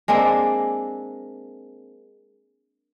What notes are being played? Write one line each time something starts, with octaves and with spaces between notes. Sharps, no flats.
G#3 A#3 C4 D4